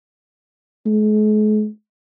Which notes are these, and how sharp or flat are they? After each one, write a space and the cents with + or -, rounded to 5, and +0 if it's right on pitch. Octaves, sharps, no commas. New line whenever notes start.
G#3 +45